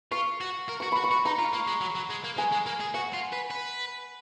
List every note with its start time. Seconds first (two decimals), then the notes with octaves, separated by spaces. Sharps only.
0.12 F4 C#6
0.41 F#4
0.69 A#4
0.80 F#4 C#6
0.92 F#4 B5
1.04 C#6
1.11 F#4
1.25 D#4 A#5
1.39 F4
1.53 A#3
1.67 G#3
1.81 F#3
1.95 F#3
2.10 G#3
2.24 A#3
2.37 G#3 G#5
2.52 G#3
2.66 A#3
2.80 G#4
2.94 F#4 F#5
3.13 F4
3.32 B4
3.50 B4